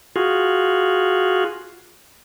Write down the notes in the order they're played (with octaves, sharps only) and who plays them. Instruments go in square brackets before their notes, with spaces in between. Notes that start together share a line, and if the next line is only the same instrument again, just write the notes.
[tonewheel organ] F4 F#4 G#4